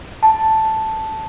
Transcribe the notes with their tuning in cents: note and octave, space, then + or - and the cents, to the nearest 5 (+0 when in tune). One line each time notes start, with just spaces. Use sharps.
A5 +0